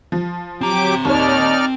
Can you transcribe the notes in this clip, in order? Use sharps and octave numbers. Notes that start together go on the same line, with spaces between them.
F3
F#3 C4 G4 A#5 D6
D#2 D#4 C#5 D5 F6